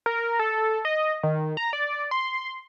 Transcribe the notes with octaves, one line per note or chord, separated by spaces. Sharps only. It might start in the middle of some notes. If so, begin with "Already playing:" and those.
A#4
A4
D#5
D#3
A#5
D5
C6